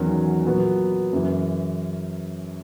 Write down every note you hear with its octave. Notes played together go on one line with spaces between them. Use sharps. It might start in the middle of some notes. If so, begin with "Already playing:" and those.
Already playing: E2 D#3 F#3 C#4 F#4
A#2 F#3 B3
F#2 C#3 E3